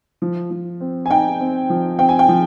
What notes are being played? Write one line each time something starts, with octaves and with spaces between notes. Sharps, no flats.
F3
F3
C4
G#5
D#4 G5
C4
F3
C4 G5
G#5
G5
F3